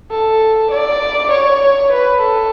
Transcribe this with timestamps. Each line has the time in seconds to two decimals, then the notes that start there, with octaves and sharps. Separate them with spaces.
0.11 A4
0.72 D5
1.32 C#5
1.93 B4
2.22 A4